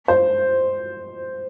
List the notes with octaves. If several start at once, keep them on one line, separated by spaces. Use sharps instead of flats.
C5